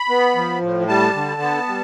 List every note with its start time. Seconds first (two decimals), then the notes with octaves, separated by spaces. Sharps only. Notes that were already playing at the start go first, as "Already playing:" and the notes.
Already playing: B5
0.09 B3
0.35 F3
0.62 A2
0.88 G3 A5
1.15 D3
1.42 B3
1.68 G3